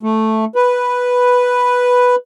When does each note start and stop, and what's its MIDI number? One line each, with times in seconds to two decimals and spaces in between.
0.03 0.45 57
0.55 2.16 71